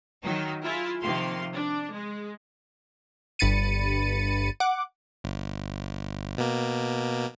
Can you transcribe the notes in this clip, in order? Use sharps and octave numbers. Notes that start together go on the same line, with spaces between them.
D#3 F#3 D#4
E4 F4 G#4 E5
C3 D#3 F3 A#3 F5 C6
D4
G#3
G1 G2 B5 A6 C#7 D#7
F#5 D6
G1
B2 A#3